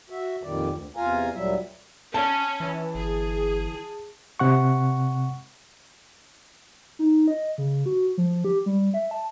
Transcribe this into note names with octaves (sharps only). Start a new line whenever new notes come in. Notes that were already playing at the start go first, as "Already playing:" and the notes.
F#4 E5
F2 A#2 D#3 G3 D5
D2
E2 C3 F4 F5 G#5 A#5
D2 A#2 F#3 G3 E5
C#4 A5
E3
G1 G#4
C3 F#5 C#6
D#4
D#5
C#3
F#4
F3
G4
G3
E5
A5